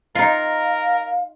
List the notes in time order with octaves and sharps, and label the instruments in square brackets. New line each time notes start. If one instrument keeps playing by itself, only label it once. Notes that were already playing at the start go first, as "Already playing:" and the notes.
[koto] D#4 F4 [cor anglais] A#4 [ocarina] F5